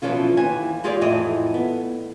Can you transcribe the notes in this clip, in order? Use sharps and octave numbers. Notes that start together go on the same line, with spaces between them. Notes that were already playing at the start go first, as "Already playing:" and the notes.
F#2 B2 E3 F3 C#4 F4
D#2 E3 G#5
G#3 F4 G4 G#4 C#5 D5
F2 A2 E3 E4 D#5
B3